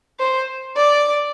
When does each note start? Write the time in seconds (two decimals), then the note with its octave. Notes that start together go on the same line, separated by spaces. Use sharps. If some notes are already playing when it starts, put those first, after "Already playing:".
0.19 C5
0.77 D5